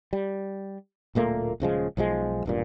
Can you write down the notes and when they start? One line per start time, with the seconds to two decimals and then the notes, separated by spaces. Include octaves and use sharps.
0.13 G3
1.15 D1 A#2 A3 A#3
1.60 D#1 C#3 F3 G#3
1.97 B1 F3 F#3 G#3
2.46 E1 G2 A#2